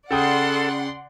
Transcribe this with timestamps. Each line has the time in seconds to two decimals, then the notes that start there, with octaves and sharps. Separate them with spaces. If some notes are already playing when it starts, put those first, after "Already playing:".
0.11 C#3 A4 D5 F#5 G5 C6 D#6